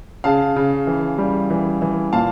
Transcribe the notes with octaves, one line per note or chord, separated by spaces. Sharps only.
C#3 F5 A5
C#3
E3
G3
E3
E3
A#2 F5 A5